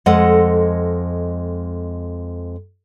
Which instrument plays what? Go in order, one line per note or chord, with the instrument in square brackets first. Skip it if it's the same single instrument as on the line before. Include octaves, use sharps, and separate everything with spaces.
[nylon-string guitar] F2 G#3 A4 D#5 F#5